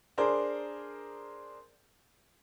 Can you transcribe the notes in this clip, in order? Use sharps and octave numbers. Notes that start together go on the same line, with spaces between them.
D4 G#4 A#4 C5